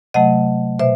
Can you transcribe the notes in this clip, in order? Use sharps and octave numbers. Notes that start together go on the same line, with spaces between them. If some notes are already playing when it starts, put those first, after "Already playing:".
C3 F#3 A3 D#5 F#5
B2 C5 E5